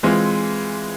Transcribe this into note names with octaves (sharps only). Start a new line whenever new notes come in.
E3 G#3 C4 F4